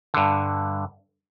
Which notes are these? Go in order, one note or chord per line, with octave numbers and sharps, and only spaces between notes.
G2 D3